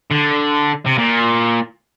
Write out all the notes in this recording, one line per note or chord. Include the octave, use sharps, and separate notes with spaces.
D3
C3
A#2